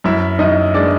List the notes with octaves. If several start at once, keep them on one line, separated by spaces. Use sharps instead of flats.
F#2 E4 E5
F#2 D#4 D#5
G#3 D4 D5